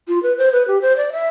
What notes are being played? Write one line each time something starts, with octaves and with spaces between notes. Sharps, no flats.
F4
B4
C5
B4
G4
C5
D5
E5